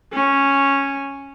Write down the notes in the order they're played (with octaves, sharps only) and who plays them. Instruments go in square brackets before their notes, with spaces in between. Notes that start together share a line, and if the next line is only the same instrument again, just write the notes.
[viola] C#4